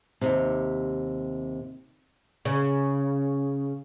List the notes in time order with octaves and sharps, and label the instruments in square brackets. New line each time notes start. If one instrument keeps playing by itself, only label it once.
[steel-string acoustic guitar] D#2 C3
[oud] C#3